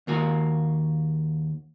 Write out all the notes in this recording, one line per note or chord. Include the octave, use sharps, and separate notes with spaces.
D#2 A#3 F#4